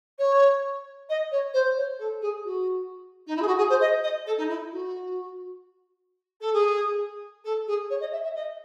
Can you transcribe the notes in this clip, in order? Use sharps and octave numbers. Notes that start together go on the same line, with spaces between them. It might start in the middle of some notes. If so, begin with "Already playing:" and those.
C#5
D#5
C#5
C5
C#5
A4
G#4
F#4
D#4
E4
G#4
F#4
G#4
C5
D#5
D#5
A4
D#4
E4
F#4
A4
G#4
A4
G#4
C#5
D#5
E5
E5
D#5